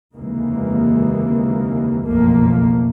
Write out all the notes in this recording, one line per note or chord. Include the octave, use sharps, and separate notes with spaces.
F1 D#2 C#3 E3 G#3 A#3
F#1 B1 F2 F3 A3 A#3